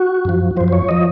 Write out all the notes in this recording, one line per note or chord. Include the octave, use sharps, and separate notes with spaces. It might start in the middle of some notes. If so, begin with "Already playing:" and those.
Already playing: F#4
F#2 F3
F#2 F3 C5
C5
C#5
F3 D#5